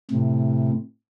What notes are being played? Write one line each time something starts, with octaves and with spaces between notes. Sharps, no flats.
A2 C3